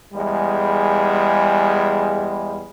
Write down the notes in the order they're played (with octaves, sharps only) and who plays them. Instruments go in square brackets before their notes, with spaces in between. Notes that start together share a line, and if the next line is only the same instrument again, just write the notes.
[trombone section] E2 G3 G#3